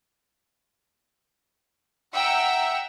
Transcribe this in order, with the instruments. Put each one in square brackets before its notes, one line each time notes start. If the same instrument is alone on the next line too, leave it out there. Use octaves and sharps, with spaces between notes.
[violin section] E5 F#5 G5 A#5 E6